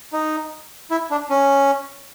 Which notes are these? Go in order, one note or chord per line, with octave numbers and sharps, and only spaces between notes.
D#4
E4
D4
C#4